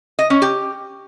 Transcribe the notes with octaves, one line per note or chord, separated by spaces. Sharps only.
D#5
C#4
G4